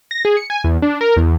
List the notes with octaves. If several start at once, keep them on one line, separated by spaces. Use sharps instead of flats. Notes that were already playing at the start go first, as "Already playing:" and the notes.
A#6
G#4
C#7
G#5
E2
D4
A#4
E2